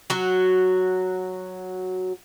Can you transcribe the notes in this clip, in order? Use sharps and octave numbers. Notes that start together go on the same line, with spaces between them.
F#3 F#4